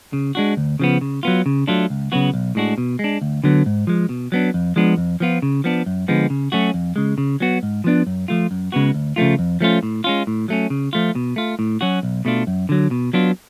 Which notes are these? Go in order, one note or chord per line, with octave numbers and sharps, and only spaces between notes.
C#3
G#3 D4 F#4
D2
C#3 F3 B3
C#3
F#3 B3 F4
C#3
F#3 A3 D4 F4
C#2
C#3 F#3 B3 F#4
B1
A2 G#3 D4 F#4
B2
G#3
D4
D2
D3 F#3 B3
G#2
F3 G#3
B2
F#3 B3 D4
F2
F3 G#3 B3 D4
F2
F3 B3 F4
C#3
F3 B3 D4
F#2
D3 F3 G#3 B3
C#3
F#3 A3 C#4 F#4
F2
C#3 G#3
C#3
F#3 B3 F#4
G#2
F3 B3 D4
F#2
F3 A3 F4
F#2
C#3 G#3 B3 F#4
D2
C#3 F3 A3 F4
F2
F3 A3 C#4 F4
A2
G#3 C#4 F4
A2
F#3 A3 C#4
C#3
F3 A3 F4
B2
A3 F4
A2
F#3 C#4 F#4
B1
B2 A3 D4 F4
F#2
D3 F#3
B2
F#3 B3 D4 F4